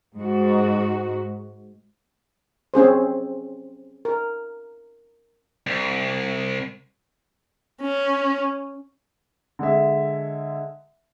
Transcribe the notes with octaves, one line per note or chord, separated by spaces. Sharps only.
G#2 F#4
C4 C#4 G#4 C5
A#4
C2
C#4
D3 G#3 E5